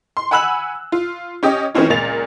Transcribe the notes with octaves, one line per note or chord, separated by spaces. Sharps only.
C6
F#5 G#5 B5 E6 F#6 F#7
F4
C#4 G4 D#5
D#3 E3 A3 C4 C#4 F4
C#2 A#2 A#3 A6 F7